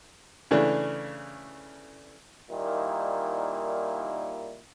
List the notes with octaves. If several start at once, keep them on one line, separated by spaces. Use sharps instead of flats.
C#3 E3 A3 D4
A#2 D#3 G3 A#3 D#4 E4